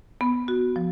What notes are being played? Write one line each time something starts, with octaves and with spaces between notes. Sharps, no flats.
B3
F#4
F3